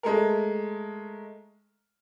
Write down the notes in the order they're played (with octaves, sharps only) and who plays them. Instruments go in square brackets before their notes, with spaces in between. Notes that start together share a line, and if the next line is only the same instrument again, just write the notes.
[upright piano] G#3 A3 A#4